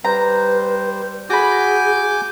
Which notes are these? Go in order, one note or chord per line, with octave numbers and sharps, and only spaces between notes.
G3 B4 C5 A#5
F#4 G#4 G#5 B5 D6 G6